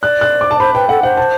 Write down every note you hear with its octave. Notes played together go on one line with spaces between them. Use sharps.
D5 F#6
F#6
D6
A5
C5 B5
B4 G5
A4 F#5
C5 F#5
A5